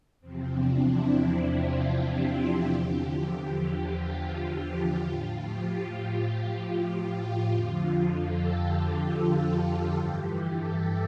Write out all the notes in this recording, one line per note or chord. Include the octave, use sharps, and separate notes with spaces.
E2 C3 F3 C4
D4
E4
F4
F4
G4
G4
E2 D3 F3
F4
A2 F3 F4
G4
F4
F2 D3 F3
A4
G4
A4
G4
G4
F4
G2 E3 G4
A4